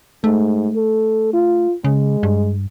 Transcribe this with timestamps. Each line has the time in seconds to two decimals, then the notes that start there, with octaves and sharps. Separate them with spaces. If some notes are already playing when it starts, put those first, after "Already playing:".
0.24 G#2 A3
0.76 A4
1.33 F4
1.84 C#3 G#3
2.23 G2